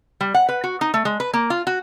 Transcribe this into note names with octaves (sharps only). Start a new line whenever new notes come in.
G3
F#5
B4
F#4
D#4
A3
G#3
B4
A#3
F4
F#4